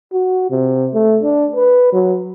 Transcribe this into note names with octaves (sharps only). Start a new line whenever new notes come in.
F#4
C3
A3
D4
B4
F#3